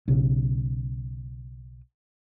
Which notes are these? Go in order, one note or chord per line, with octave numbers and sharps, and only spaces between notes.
B1 C#3